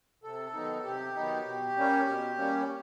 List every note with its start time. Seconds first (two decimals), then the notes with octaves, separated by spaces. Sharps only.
0.23 C3 A4
0.54 D#3 F#3 B3 D#4
0.84 C3 G4
1.15 D#3 F#3 B3 D#4
1.45 B2
1.76 G3 A#3 C#4
2.07 B2
2.37 G3 A#3 C#4